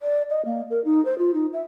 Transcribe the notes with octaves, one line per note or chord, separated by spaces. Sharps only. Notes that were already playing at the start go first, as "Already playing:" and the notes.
D5
D#5
A#3
A#4
D#4
C5
F4
D#4
E5